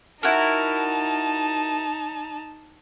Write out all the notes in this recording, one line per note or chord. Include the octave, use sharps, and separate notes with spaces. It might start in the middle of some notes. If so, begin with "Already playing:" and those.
D#4 E4 F#4 A#4 A5